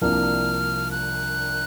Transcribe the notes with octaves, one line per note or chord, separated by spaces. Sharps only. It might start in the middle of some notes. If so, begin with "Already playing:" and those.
C2 C3 F3 A#3 D4 F6
F#6